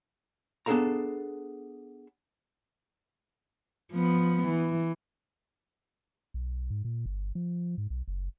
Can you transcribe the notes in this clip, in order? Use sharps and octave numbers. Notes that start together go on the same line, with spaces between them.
B3 D4 G#4 A4 F5 A#5
F3 B3
E3
B1
G#2
A#2
G1
F3
G#2
B1
F#1